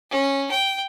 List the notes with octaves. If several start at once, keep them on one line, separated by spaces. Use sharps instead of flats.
C#4
G5